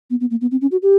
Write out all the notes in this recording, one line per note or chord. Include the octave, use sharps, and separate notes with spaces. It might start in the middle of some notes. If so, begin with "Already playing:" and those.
B3
B3
A#3
B3
C4
C#4
F#4
G4